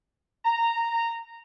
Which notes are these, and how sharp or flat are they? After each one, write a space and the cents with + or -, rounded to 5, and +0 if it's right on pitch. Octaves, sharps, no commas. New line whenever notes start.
A#5 -10